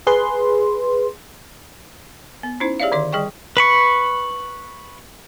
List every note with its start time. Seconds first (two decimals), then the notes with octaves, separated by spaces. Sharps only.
0.07 G#4 B4 C6
2.43 B3
2.60 C#4 D#4 E4 C5
2.80 G4 G#4 C#5 D5 E5 F5
2.92 D3 D#3 D5 C6
3.13 G3 G#4 D#5 G5 C#6
3.57 B4 B5 C#6